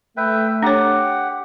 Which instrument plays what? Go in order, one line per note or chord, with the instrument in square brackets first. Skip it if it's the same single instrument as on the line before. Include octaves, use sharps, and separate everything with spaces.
[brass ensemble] A3 [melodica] B4 E5 G5
[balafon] D4 C#5 [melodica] G4 F#5